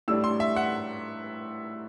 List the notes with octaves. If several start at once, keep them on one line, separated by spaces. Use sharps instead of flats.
A2 G3 D4 E6
C6
E5
F#5